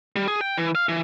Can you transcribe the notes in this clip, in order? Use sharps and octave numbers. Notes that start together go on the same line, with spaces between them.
G3
G#4
G5
E3
F5
E3